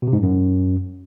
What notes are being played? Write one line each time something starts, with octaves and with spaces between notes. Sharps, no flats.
B2
C3
G#2
G2
F#2